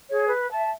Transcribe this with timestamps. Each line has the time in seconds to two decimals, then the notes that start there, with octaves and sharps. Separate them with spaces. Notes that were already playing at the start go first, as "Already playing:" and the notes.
0.08 G#4 C#5
0.29 B4
0.50 E5 A5